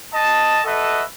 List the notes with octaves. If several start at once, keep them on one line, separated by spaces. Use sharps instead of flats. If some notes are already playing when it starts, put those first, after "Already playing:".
D#5 A5
F#4 A4 B4 D#5 E5